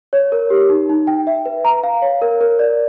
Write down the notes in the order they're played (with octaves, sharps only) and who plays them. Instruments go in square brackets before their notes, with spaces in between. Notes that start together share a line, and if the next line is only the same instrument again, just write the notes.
[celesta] C#5
A#4
G4
D#4
D#4
G5
E5
B4
A#5
F5
C#5
A#4
A#4
D5